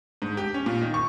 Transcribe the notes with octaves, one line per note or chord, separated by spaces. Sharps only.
G#2
G4
C#4
A#2
D#3
C#6